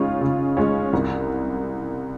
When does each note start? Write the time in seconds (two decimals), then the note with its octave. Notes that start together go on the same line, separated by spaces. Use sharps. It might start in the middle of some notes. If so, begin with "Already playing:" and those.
Already playing: C#3 G#3 C#4 F4
0.21 C#3
0.57 G#3 C#4 F4
0.93 C2